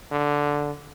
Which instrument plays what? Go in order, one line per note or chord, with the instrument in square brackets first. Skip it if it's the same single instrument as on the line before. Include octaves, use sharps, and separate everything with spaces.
[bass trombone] D3